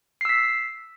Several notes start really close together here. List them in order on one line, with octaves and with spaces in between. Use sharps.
C7 E6 B6